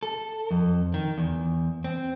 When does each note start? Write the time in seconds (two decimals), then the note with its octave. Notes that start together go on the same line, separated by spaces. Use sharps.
0.03 A4
0.51 F2
0.94 D#3
1.18 E2
1.84 C4